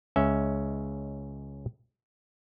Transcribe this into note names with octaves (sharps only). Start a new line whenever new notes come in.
C#2 G#3 C#4 E5